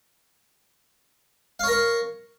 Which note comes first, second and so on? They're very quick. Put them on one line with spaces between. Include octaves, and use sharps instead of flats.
F5 C#5 A#4 C#6